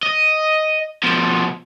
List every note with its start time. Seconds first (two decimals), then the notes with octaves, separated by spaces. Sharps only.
0.03 D#5
1.03 B2 F3